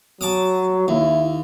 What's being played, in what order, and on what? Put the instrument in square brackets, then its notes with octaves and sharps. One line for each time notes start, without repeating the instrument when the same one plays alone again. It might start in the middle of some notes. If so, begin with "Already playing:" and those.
[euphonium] F#3 [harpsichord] A5 D6 D#6
[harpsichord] D#2 [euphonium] E4